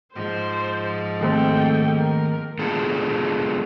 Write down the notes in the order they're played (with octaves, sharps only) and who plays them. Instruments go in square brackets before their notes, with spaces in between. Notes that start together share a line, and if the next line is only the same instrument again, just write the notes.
[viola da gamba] G#2 F3 [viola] C5
[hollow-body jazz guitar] D#2 A3 C4 [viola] A4 G5
[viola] A#4
[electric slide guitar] G#3 B3 D4 F4 G#4 A4